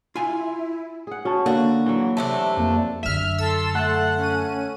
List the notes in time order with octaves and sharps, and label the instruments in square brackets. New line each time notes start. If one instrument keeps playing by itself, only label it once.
[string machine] E4 [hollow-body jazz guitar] F4 G#5
[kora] G#4 F#5
[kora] C#4 [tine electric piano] F#4 A5
[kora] D3 [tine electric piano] A#3 [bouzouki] F#4
[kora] E3 F#3
[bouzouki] C3 A3 D4 [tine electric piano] A5
[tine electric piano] F2 A#3
[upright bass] F#2 D3 [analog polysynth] E5 F6
[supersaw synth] A4 A5 C6 [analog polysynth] E6
[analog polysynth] A3 [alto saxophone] F#5
[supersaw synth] C#4 D#7